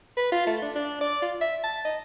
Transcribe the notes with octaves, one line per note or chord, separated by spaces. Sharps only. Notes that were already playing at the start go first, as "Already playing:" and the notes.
B4
F4
A3
D4
D4
D5
F4
E5
A5
D#5